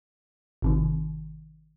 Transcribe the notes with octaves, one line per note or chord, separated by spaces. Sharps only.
G#1 C3 D#3